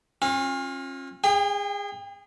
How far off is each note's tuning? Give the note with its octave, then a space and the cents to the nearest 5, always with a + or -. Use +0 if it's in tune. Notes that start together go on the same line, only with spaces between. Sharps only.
C#4 -40 F4 +15
G#4 -25 G5 +30